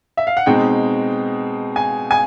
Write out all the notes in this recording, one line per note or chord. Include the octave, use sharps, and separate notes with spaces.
E5
F5
F#5
B2 G#3 C4 D#4 G5
G#5
G#5